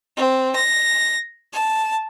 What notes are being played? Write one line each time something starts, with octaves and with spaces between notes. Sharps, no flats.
C4
A#6
A5